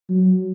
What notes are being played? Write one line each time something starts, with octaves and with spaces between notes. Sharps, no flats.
F#3